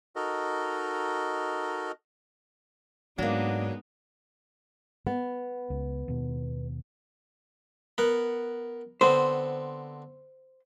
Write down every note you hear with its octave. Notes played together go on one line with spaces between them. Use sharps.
D#4 F#4 A4 A#4 D#5
G#2 F#3 G#3 A#3 B3 D4 D#4
B3
C#2
D#2 B2
B3 A#4 F#5
D3 B3 C4 C5